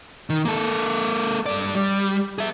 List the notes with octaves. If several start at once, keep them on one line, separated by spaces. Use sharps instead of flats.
D#3
A#3 A4
G2 D5
G3
G#4 E5